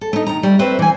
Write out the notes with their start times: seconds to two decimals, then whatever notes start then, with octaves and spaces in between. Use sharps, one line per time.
0.01 A4
0.13 A3 D#4
0.27 D#3 A#5
0.43 G3 A3
0.59 A3 C4 B4 C5 E5
0.79 E3 G#5